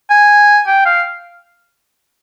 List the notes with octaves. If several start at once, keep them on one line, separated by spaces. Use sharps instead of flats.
G#5
G5
F5